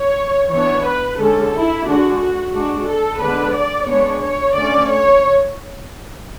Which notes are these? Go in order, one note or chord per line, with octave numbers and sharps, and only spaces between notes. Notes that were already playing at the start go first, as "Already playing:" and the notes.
Already playing: C#5
E3 B3 D4 C#5
B4
D3 G#3 C#4 A4
E4
D3 G#3 D4 F#4
F#4
G#3 D4 F#4
A4
D3 G#3 B3 D4 B4
D5
G#3 B3 D4 C#5
C#5
D3 A3 C#4 D5
C#5